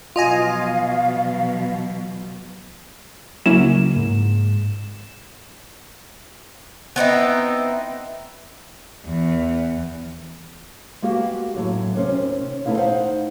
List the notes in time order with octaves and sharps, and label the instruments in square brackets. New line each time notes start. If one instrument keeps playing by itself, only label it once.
[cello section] B2 F3 F#3 [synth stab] F4 D#5 G#5 [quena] F5
[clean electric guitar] C#2 A#3 [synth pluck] F#3 C#4 E4 [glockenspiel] E7
[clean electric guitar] G#2
[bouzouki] B3 C4 D#4 E4
[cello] E2
[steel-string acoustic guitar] G#3 A#3 B3 F#4 G4 F5
F#2 A2 F#3
D#2 C3 C#4 C5
D#2 A3 B3 D#4 E4 F5
D#4 C5 F5 F#5